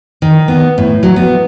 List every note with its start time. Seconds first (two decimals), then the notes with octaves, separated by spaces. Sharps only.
0.22 D#3
0.48 B3
0.78 A2
1.03 F#3
1.16 B3